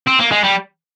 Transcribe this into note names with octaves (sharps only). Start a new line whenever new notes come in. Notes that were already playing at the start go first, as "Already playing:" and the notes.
C4
A#3
G#3
G3